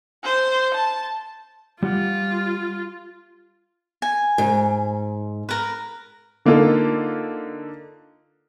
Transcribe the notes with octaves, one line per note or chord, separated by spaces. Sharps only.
C5
A5
G3 F4 G4 F#5
G#5
G#2
A#4 B4
D3 A#3 D#4 F4 A4